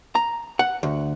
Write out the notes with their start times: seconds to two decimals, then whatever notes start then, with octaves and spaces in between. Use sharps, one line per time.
0.15 A#5
0.59 F#5
0.83 D2